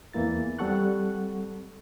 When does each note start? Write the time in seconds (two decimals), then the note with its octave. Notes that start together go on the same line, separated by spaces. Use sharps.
0.13 E2 E3 A#3 E4 A6
0.59 G3 C4 A4 F#5 C#6 F#6